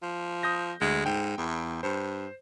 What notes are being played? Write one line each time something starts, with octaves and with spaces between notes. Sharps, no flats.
F3
D#6 G6 A#6
D2 G#3
G#2 G5
E2
G2 C5